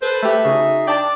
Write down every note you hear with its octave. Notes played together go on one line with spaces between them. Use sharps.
A4 B4 C5
A3 G4 E5
C#3 D#4 F#4 G#4
D4 D5 G5 A5 A6